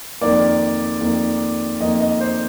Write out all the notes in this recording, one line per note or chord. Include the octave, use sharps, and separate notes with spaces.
F2 D#3 A#3 D5
F2 D#3 A#3
F2 D#3 A#3 D#5
D#5
C5